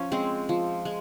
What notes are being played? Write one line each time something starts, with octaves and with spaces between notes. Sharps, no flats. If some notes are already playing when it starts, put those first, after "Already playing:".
Already playing: F3 C#4
G#3 C4
F3
G#3